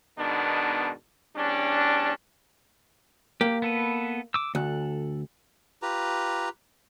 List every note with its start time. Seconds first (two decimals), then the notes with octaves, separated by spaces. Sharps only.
0.18 G#2 B2 D#3 B3 D4
1.35 E2 G3 C#4 D4
3.41 A#3 G4
3.62 B3 A4 B4
4.34 D6 E6
4.55 D2 A4 F#6
5.82 F4 G4 B4 A#5